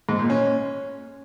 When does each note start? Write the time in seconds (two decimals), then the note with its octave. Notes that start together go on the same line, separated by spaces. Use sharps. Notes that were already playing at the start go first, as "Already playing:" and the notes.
0.09 G#2
0.19 A#2
0.30 C#4